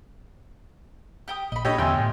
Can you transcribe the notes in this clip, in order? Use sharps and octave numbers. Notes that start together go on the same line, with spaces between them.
G4 G5 D#6
A#1 D#5 B5
A#2 D4 G4 A4 C#5 D#5
A1 E2 D3 B3 G5 G#5 C6 E6
A2